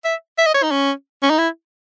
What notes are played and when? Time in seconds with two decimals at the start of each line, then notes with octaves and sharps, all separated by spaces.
0.04 E5
0.38 E5
0.46 D#5
0.54 C#5
0.63 D#4
0.71 C#4
1.23 C#4
1.30 D#4
1.38 E4